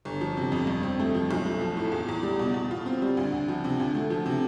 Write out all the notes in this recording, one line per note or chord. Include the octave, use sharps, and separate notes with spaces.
G1
F3
C3
F2
G2
C4
A3
F3
B1
A3
F3
A2
E2
E2
G3
B2
B2
F4
C4
G3
D2
D2
F3
C3
D2
A3
F3
C3